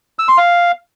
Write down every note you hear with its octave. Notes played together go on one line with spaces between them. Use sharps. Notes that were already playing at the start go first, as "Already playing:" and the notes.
E6
C6
F5